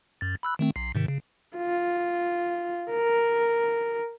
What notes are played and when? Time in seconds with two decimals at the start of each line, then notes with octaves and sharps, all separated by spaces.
0.21 F#2 A6
0.43 B5 E6 F#6
0.59 D#3 A3 C4
0.76 B1 C7
0.95 G#2 C3 D#3
1.08 C#3
1.57 F4
2.91 A#4